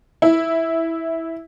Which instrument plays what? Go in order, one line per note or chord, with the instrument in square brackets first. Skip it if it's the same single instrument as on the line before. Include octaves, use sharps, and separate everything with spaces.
[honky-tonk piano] E4